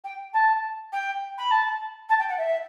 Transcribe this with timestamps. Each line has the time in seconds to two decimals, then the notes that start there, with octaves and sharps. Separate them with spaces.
0.04 G5
0.34 A5
0.93 G5
1.38 B5
1.51 A5
2.09 A5
2.19 G5
2.29 F#5
2.38 E5